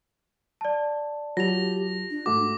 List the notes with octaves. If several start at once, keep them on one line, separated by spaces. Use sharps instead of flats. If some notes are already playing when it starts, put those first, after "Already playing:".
D5 A5
F#3 F4 G4 A5 A#6 F7
D4
G#2 A3 F#4 D6